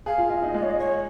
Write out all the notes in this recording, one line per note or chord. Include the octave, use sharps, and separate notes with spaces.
G#4 F5
F4
F4 D#5
F5
D#4 D#5
G#3 D#5
C#5
D#5
C#5